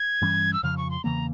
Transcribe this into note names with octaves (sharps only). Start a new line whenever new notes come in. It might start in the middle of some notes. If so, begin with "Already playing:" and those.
Already playing: G#6
G2 E3 G3 C#4
E6
F2 C#3 F3 F6
C#6
C6
E2 C#3 E3 A#3 A#5